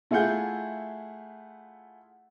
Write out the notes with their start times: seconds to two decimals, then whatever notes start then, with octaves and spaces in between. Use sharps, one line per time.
0.11 A3 E4 F4 G#4 F#5 G6